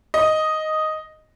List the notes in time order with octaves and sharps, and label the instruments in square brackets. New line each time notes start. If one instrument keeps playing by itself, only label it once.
[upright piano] D#5